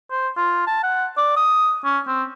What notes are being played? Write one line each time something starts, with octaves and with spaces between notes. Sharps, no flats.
C5
F4
A5
F#5
D5
D#6
C#4
C4